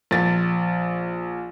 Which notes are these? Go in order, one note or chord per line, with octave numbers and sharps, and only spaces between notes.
A#1 A6